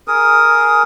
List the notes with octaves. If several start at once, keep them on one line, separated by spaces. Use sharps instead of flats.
G#4 A#4 D#6